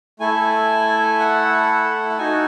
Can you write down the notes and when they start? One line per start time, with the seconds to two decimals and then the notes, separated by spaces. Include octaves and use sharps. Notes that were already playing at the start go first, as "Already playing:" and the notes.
0.20 A3 E4 A4 G#5
1.19 F#5
2.10 F#5
2.18 D#4 F#4 A4 G#5